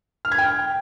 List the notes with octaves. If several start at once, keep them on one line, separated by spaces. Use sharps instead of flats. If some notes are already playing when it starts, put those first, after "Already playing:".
F6
G#6
G5